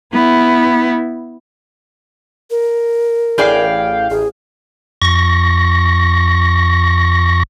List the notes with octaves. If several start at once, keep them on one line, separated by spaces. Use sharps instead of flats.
B3 E4
A#4
A1 A2 G#4 D5 F5 G5
A1 G#4
F2 C#6 A#6